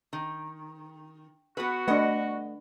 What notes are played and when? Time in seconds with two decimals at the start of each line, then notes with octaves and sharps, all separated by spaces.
0.13 D#3
1.57 B3 F#4 B4
1.88 A3 D4 B4 D#5 F#5